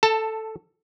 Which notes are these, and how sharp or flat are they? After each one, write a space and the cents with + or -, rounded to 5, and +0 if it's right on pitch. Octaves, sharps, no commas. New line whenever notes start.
A4 +0 A5 +20